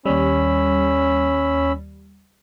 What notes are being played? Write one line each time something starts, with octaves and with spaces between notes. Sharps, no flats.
D#2 G3 C#4 B5 E6